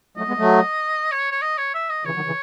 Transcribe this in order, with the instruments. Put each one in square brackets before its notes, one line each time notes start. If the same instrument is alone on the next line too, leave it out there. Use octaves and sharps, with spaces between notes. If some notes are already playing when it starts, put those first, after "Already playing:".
[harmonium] F#3 A3 [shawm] D#5
[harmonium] G#3 B3
F#3 A3
[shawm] C#5
C#5
D#5
C#5
E5
D#5
[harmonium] C#3 E3 [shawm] C#5
[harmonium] D#3 F#3
C#3 E3